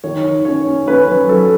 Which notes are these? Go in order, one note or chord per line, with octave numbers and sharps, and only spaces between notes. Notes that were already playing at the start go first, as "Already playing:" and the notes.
D#3 C#5
D#3
C#4 C#5
C#4
C#4 B4
F#3
F#3 A4